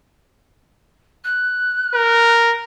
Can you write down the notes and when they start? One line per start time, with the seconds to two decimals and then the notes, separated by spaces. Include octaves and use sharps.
1.24 F#6
1.95 A#4